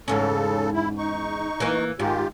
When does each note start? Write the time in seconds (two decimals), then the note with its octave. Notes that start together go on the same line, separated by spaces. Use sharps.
0.08 E2 G#2 C#3 C#4 A4
0.73 E4
0.98 D#4 C#6
1.60 E3 A#3
2.00 G#2 D#3 F4 G4